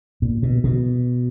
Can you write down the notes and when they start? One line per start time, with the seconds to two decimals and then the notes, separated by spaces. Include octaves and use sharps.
0.22 A#2
0.43 B2
0.64 B2